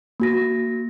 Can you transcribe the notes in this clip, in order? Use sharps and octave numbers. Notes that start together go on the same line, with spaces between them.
A#3 F#4 A#6